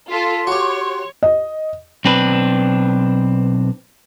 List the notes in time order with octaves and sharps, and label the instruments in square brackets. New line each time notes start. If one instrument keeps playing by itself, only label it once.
[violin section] F4 A4 [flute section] C6 [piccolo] B6
[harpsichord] F#4 G4 [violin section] C#5 [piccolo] C#6
[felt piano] D#5
[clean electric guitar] B1 C4 D4 B4